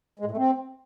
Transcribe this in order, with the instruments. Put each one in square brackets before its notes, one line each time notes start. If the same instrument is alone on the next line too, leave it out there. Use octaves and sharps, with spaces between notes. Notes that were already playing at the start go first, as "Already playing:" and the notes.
[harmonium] G#3
A2
A3
C4